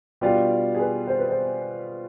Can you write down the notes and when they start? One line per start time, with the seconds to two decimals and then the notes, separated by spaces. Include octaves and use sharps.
0.21 B2 G3 D4 F4 G4
0.75 G#4
0.79 B4
1.07 C5
1.18 B4
1.29 C5